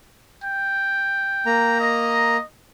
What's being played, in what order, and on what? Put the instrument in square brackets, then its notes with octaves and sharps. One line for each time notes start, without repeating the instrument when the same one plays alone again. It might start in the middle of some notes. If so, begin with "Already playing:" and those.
[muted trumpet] G5
[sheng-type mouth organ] A#3 A#5
[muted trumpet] D#5